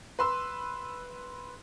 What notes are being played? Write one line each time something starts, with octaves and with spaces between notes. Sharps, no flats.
B4 C6 E6